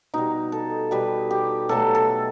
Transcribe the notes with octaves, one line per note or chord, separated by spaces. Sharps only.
B2 G3 D#4
A4
B2 G3 B4
G4
B2 F#3 A3 A4
A4